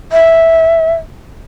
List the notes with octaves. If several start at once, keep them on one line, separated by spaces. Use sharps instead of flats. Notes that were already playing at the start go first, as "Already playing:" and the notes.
E5